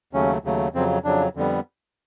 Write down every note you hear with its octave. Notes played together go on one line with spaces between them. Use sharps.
D#2 C#3 F#3 A3 C#4
D#2 C#3 F#3 A3
F2 C#3 F#3 C4
F2 C#3 F#3 D4
F2 D3 G3 B3